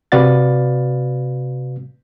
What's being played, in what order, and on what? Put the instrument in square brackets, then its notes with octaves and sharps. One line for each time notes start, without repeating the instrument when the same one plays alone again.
[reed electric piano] C3 F#4 B4 D5 F5 A6